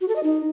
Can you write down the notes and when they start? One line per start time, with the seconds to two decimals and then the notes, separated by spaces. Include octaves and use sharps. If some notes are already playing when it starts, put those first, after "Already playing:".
0.01 F#4
0.08 A4
0.16 D#5
0.23 D#4